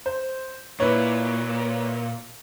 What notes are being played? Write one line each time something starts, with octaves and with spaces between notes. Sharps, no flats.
C5
A#2 E4 B4 C#5